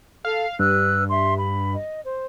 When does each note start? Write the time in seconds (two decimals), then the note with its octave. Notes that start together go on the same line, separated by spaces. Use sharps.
0.25 A4 F5
0.59 G2 B4 E6 F#6
1.09 E5 C6
1.38 B5
1.74 D#5
2.04 C5